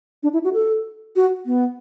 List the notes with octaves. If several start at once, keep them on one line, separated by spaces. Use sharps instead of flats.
D4
E4
F#4
A4
F#4
B3